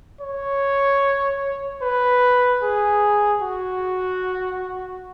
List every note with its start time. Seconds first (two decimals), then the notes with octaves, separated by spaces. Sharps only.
0.21 C#5
1.82 B4
2.63 G#4
3.42 F#4